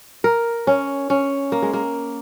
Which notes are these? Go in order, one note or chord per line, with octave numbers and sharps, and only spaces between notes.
A#4
C#4
C#4
A#3
G#3
A#3